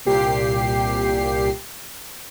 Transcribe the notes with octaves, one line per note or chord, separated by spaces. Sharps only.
C2 A#2 G4 C7